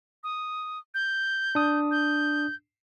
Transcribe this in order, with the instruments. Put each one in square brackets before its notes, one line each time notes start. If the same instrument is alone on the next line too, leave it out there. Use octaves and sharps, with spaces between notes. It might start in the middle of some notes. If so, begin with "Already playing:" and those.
[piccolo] D#6
G6
[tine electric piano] D4 D#6
[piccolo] G6